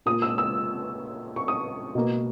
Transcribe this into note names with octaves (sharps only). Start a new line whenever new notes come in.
A#2 A#3 D#6
E6
E6
C#6
D#6
B2 A#3